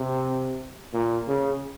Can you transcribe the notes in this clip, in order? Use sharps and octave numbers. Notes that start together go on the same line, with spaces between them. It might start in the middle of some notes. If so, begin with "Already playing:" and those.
Already playing: C3
A#2
C#3